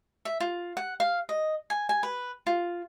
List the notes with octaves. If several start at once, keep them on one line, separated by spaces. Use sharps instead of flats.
E5
F4
F#5
F5
D#5
G#5
G#5
B4
F4